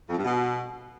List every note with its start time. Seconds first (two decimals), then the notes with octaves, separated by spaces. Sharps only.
0.09 F2
0.17 G2
0.24 B2